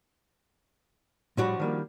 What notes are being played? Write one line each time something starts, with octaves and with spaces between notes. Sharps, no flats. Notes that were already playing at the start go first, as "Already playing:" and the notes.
A2 F3 G3 D4 F#4
D#3 G3 A#3